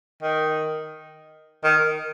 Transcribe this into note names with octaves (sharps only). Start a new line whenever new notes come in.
D#3
D#3